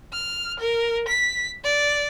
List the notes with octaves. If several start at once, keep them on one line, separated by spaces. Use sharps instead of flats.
F6
A#4
B6
D5